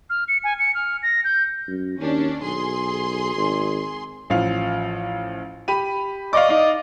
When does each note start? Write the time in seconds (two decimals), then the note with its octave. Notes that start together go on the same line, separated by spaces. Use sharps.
0.10 F6
0.28 C#7
0.44 G#5
0.59 C#7
0.75 F6
1.03 A#6
1.24 G6
1.68 F#2
1.99 D#2 C#4 D4
2.42 B1 G#4 C6
3.36 G#1
4.30 A1 F3 F5
5.68 G4 B5 D#7
6.33 D5 D#5 F5 C#6 D6
6.49 D#4 F5